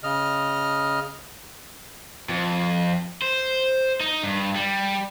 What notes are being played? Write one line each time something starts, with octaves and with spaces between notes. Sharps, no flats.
C#3 D#5 F6
F2
C5
D#4
G2
G3